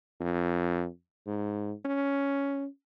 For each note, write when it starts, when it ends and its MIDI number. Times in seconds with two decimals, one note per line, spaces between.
0.21 0.87 41
1.26 1.72 44
1.85 2.66 61